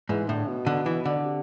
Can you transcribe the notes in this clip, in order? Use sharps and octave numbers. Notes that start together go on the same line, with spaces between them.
G#2 E3
A2 D3
B2
D3
E3
D3
C3